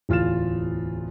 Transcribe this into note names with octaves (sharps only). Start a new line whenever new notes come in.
D1 E2 F4 F6 A6 E7